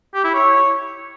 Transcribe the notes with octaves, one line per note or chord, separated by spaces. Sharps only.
G4
E4
C#5